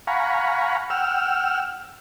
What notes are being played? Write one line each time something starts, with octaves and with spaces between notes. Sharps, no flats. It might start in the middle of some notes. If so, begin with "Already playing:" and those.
F5 F#5 G#5 A#5 B5 C#6
F#5 G5 E6 F6